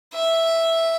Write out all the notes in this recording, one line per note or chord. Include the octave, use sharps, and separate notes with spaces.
E5